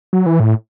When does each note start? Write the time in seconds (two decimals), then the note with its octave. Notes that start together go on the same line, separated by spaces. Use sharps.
0.13 F#3
0.26 E3
0.40 A2